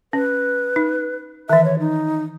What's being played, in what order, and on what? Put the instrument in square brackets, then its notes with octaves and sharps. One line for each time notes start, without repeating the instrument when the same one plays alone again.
[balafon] C#4 [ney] B4
[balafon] D#4
[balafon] D#3 E3 [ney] E5
[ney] C#5
D#4